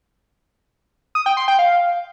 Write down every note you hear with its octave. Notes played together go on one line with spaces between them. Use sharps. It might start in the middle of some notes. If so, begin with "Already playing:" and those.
D#6
G5
C6
G5
F5